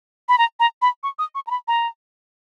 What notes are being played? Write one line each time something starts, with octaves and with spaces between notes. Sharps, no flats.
B5
A#5
A#5
B5
C#6
D#6
C#6
A#5
B5
A#5